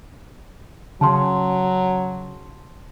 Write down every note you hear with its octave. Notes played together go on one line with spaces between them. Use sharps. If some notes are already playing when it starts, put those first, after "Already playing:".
C#3 F#3 A5 C6